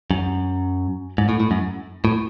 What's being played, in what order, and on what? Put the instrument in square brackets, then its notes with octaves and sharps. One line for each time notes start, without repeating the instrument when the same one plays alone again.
[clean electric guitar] F#2
G#2
A2
A2
F#2
A2